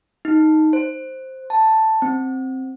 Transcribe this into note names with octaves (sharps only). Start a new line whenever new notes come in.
D#4
C5
A5
C4